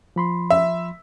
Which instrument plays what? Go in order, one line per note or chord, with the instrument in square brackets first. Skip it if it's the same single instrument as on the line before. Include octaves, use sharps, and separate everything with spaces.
[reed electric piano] F3 B5 C6
[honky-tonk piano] E5